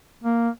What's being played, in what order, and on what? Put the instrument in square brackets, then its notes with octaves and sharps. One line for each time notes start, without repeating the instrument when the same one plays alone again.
[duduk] A#3